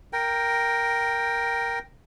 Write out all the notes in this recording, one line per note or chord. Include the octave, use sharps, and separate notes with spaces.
A#4 G5